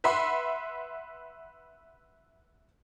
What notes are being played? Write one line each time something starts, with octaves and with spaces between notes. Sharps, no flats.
B4 E5 F#5 B5 C6